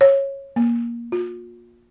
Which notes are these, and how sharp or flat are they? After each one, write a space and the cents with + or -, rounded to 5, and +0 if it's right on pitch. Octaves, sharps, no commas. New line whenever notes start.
C#5 -15
A#3 +15
F4 +40